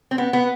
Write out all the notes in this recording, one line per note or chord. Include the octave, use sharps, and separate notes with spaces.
C4
B3
B3